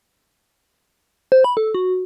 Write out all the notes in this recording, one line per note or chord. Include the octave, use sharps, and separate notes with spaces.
C5
B5
A4
F#4